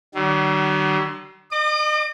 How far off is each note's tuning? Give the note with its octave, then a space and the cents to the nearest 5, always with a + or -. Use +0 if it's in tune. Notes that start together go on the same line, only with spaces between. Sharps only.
D3 +45 F#3 +45
D#5 -40 D6 +40